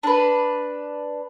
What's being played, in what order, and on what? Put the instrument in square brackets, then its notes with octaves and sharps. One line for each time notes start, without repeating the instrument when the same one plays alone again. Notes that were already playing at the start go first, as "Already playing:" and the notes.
[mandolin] D4 B4